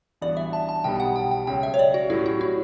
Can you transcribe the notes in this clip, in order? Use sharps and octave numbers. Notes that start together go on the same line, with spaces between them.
A1 G2 E3 B3 F#4 D5
E5
A5
A5
B1 B2 G3 B3 G5
F#5
G5
G5
C#2 C#3 F#3 G5
E5
C#5
D5
F#4
A2 F#3 C#4 E4 G4
F#4
E4